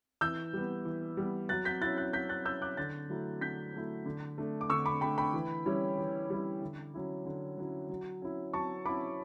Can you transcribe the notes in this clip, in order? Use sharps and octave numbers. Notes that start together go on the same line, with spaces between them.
E3 E6 G6
G3 B3
E3
G3 B3
F#3 F#6 A6
G6 B6
C#4 E4 F#6 A6
F#6 A6
F#3 G6 B6
F#6 A6
C#4 E4 E6 G6
D6 F#6
D3 F#6 A6
F#3 A3 E4
D3 G6 B6
F#3 A3 E4
D3
A3 D4
D6
D3 C#6 E6
B5 D6
A3 D4 G5 B5
G5 B5
E3
G3 C#4 E4
E3
G3 C#4 E4
D3
F#3 C#4 E4
D3
F#3 C#4 E4
F#3
C#4 E4
F#3 A5 C#6
C#4 E4 B5 D6